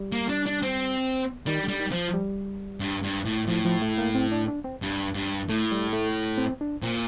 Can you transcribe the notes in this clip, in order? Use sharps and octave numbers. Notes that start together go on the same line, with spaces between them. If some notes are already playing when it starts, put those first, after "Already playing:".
Already playing: G3
A#3
D4
D4
C4
D#3 G3
D3
G3
D#3
F3
G3
G2
G2
A2
A2 F3
F3
A3
A#3
C4
D4
D4
C4
G2
G2
A2 A3
G3
A3
C4
D4
A#2 C4